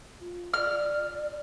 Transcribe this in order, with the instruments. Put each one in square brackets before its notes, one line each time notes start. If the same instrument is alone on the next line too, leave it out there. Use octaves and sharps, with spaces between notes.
[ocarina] F4
[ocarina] D5 [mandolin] F6